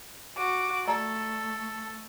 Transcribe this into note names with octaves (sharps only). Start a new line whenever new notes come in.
F#4 D6
A3 A4 D5 A#5